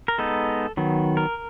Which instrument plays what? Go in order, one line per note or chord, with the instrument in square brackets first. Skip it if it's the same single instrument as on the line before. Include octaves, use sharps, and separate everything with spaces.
[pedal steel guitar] A#4
G#3 B3 D#4 A4
D#3 F#3 B3
A#4